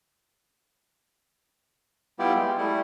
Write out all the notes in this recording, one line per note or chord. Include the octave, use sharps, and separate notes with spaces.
G3 B3 E4 F4 G4 D5
G#3
G3 A3 E4